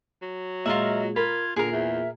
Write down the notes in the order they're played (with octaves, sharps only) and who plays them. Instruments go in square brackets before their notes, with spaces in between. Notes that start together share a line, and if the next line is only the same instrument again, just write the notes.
[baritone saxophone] F#3
[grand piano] A#2 G#3 F#7 [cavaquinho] F4 A#4 E5 [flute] D#5
[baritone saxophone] F4 [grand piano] A#4 [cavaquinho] B5 [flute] G#6
[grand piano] A#2 [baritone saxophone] D3 [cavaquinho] G#4 A#4
[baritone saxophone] E2 [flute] E5